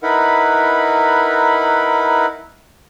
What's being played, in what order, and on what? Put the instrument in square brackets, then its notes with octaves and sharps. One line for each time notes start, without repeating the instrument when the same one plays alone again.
[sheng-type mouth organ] D#4 E4 A#4 B4 F#5 B5